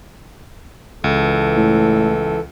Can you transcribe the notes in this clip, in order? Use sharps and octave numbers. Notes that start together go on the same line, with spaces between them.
C#2 E3 A4
A2